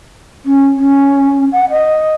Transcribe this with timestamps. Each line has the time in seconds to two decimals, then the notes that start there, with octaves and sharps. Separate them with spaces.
0.45 C#4
0.77 C#4
1.52 F#5
1.70 D#5